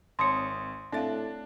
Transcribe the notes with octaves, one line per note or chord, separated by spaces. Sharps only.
G#1 C4 C#5 C6 D#6 C#7
A2 C4 D4 E5 F5 A6